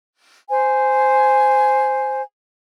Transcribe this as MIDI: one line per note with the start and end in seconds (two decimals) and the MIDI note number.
0.49 2.22 72
0.49 2.22 80